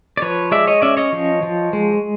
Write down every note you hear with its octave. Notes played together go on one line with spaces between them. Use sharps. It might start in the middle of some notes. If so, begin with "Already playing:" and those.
D5
F3 B4 C#5
G#3 D5 E5
C#5 D#5
C#4 D5 E5
C#5 D#5
F3
F3
G#3